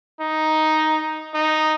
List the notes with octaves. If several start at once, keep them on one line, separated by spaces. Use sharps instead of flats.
D#4
D#4